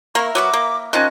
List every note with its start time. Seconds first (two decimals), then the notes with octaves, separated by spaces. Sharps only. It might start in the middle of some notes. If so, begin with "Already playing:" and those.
0.15 A#3 E4 A#4 C#6
0.35 F#3 B3 F#4 D6
0.53 A#3
0.93 D#3 F3 C#4 D#5 F#6